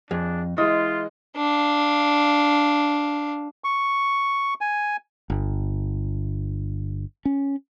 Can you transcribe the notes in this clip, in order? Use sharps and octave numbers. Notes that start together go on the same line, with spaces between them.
F2 D4 G#4
E3 G#3 E4 F4 D#5
D4 F5
C#6
G#5
G1
C#4